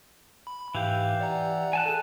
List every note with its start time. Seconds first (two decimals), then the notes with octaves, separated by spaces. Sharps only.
0.47 B5
0.75 G#2 E3 G4 F5
1.20 D5 F#5 A#5
1.73 G#5 A5 F#6
1.86 G#4 A4